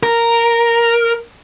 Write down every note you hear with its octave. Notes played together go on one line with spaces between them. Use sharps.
A#4